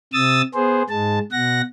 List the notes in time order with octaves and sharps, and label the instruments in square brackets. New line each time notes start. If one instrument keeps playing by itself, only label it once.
[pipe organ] C3 D#6 E6 A6
B3 G#4 C5
G#2 G#3 A5
B2 F#5 A#6